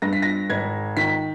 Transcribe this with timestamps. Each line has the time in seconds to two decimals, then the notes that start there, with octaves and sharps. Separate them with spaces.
0.02 G2 A#6
0.13 B6
0.22 A#6
0.49 G#1 G#6
0.97 D#3 B6